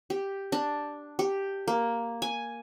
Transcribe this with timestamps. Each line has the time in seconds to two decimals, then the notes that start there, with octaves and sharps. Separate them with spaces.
0.10 G4
0.52 D4
1.19 G4
1.68 A#3
2.22 G#5